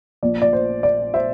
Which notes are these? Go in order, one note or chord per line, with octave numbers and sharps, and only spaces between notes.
A#1 A#2 F3 D5
D5
C5
D5
C5 E5